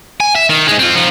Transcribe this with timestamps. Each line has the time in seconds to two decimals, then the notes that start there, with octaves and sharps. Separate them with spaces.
0.20 G#5
0.35 E5
0.50 D#3
0.67 G#2 G#3
0.79 C4 F4
0.96 F3 D#4